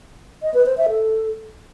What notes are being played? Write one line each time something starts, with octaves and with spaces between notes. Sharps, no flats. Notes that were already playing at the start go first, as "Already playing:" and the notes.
D#5
B4
C5
E5
A4